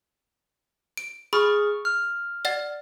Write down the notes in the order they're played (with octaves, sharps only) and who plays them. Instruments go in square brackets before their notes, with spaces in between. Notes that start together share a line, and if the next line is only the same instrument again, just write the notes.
[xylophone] D7
[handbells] G#4 C#6 F6 [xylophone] B5
[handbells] F6
[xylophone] D5 F#5 A6